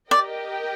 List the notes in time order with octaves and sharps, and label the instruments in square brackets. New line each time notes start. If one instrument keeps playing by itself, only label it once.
[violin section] G4 A#4 D#5 G5 [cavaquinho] D5